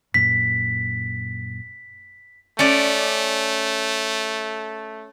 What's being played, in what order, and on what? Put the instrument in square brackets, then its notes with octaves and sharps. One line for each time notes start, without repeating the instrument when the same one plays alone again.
[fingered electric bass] F#2 A#2 [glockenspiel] B6
[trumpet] A3 [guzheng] C#4 D5